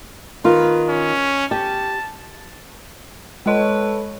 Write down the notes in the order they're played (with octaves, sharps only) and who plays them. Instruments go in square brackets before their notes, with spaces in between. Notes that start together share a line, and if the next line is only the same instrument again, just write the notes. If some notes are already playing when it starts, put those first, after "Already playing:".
[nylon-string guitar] D#3 F4 [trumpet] B4
[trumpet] C#4
[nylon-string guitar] G4 [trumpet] A5
[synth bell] G#3 D#5 [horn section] A4 B4 C#5